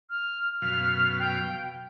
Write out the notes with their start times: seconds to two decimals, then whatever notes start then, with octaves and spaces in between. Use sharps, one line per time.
0.10 F6
0.62 F#2 B2 F5 F6
1.19 G5